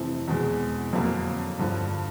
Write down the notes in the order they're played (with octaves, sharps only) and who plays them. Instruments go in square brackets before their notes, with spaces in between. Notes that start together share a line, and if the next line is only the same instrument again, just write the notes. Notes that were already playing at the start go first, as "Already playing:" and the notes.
Already playing: [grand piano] F2 C3 E3 A3 C4
E2 B2 G#3
F2 D3 F#3 A#3
G2 D3 F3